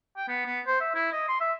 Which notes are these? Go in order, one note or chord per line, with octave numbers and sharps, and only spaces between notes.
G5
B3
B3
C5
E5
E4
D#5
C6
E5